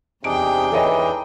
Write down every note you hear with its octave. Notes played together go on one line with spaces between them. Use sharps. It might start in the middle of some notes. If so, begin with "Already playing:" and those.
E2 C3 D4 D#4 G#4 G5 D7
E3 A4 C#5 D#5